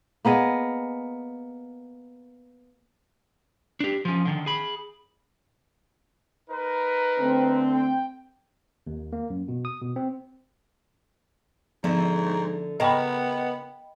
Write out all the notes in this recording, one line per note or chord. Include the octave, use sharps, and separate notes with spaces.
A#3 B3 G#4 D#5
D4 G4
F3 C#4
D3 D#3
G#4 B5
D#4 A#4 B4
D3 A3 C4
G5
D#2
A#3
F#2
B2
D#6
B2
C4
G#2 D3 F3 E4
C#3 B3 A#4 D#5 G5 B5